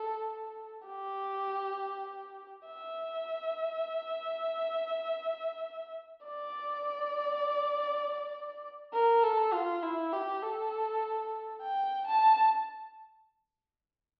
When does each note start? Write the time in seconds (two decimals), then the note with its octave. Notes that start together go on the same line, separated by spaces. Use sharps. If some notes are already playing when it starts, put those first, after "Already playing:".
Already playing: A4
0.87 G4
2.66 E5
6.24 D5
8.93 A#4
9.23 A4
9.53 F4
9.83 E4
10.13 G4
10.42 A4
11.62 G5
12.07 A5